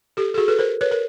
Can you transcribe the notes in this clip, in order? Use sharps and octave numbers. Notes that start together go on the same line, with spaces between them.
G4 A4
A4
F#4 G#4
A4 B4
A#4 C5
B4 C#5
A#4